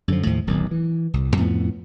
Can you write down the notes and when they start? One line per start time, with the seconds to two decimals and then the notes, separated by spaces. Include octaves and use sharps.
0.08 F#2 D3 F3
0.26 D#2 A2 F3
0.47 D1 B1 D#3
0.71 E3
1.14 C2
1.37 F2 A2 F3 B3